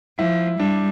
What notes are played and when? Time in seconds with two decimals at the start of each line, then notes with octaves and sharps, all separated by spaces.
0.18 F3 E4
0.59 G3 D4